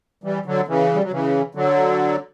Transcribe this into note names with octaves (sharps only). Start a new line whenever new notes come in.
E3 G3
D3 F#3
C#3 E3
G3
F#3
C#3 E3
D3 F#3